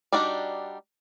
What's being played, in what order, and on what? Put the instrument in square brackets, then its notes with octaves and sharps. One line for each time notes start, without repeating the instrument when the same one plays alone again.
[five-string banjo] G3 D4 D#4 F#4 D5